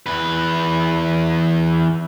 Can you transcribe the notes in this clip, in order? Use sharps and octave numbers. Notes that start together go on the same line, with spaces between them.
E2 B4